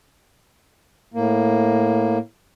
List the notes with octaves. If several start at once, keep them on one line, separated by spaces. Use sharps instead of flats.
A2 A#3